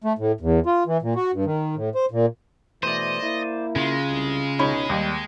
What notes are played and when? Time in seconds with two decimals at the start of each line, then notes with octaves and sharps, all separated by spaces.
0.04 A3
0.18 A2
0.41 E2
0.66 F4
0.86 E3
1.02 A#2
1.16 F#4
1.33 G2
1.45 D#3
1.76 A2
1.95 C5
2.11 A#2
2.83 B2 E3 A3 C5 D5 D#5
3.22 A#3 E4
3.76 C#3 G#3 F4
4.09 C2
4.59 C#2 B2 C#4 D#4 B5
4.90 D#2 G3